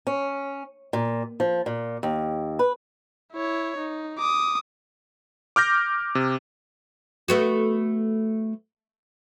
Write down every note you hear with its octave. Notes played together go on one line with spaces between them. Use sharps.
C#4
A#2
F3
A#2
D#2
B4
E4 C#5
D#4
D6 D#6
D6 F6 G6 A#6
C3
A3 B3 F#4